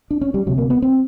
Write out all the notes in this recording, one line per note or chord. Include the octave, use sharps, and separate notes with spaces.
D4
C#4
G3
D2 C3 F#3
A#3
B3
C4